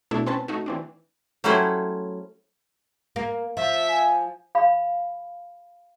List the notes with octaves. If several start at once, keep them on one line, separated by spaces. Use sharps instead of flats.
B2 A3 D4 E4
C4 C#4 B4 A5
A3 D#4 F#4
E3 C4 D4
F#3 G3 A3 C#4 E4 C5
A#3
F3 E5
G#5
F5 B5